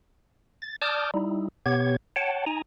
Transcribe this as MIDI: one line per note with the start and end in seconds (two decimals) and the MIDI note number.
0.62 0.76 93
0.82 1.11 74
0.82 1.11 81
0.82 1.11 86
0.82 1.11 87
0.82 1.11 89
0.82 1.11 91
1.14 1.48 55
1.14 1.48 63
1.14 1.48 64
1.66 1.96 47
1.66 1.96 59
1.66 1.96 67
1.66 1.96 73
1.66 1.96 92
2.16 2.45 73
2.16 2.45 78
2.16 2.45 79
2.16 2.45 81
2.46 2.62 63
2.46 2.62 80
2.46 2.62 82